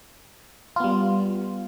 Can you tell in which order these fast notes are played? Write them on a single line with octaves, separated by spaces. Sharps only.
F4 B3 G3